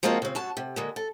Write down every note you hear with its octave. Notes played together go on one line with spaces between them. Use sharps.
F3 G#3 A#3 C4 F4 F#4
C#3 C4
F#2 F#4 A5
C3
D3 G#3 A#3
A4